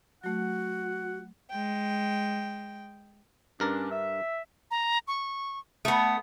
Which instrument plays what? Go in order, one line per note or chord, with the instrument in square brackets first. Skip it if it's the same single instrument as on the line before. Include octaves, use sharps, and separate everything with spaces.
[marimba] F#3 A3 [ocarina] F#4 [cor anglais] F#5
[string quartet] G#3 G5
[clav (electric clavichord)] G2 A#4 A5 [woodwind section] C#4 D4
[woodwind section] E5
[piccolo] A#5
C#6
[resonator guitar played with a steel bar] A3 B3 [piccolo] D#6